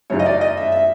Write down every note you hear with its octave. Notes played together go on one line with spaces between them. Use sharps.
F#2 C#3 E3 C#5
D#5
D5
D#5
E5
E5